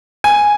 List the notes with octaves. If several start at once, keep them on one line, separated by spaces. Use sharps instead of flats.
G#5